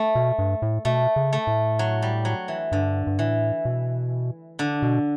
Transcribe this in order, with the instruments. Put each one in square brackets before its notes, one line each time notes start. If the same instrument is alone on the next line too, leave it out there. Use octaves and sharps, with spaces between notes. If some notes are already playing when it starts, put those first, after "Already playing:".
Already playing: [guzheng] A3
[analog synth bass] B2
G2
A2
[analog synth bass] B2 [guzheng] A3
[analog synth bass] C#3
[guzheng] A3
[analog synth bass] A2
[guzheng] F#3
G3
F#3
E3
[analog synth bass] G2 [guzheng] D3
[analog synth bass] G2
[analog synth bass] A2 [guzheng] E3
[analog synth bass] B2
[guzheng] D3
[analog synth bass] B2